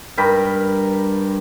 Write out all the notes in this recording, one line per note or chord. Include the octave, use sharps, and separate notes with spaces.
G2 A#4 G5 B5